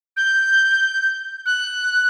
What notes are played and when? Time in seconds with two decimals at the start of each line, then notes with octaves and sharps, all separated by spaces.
0.17 G6
1.46 F#6